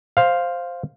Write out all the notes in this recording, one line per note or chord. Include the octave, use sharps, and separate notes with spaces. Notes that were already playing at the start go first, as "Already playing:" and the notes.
C5 F5